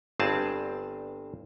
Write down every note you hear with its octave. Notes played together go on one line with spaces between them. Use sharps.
G1 G2 C4 G#4 A5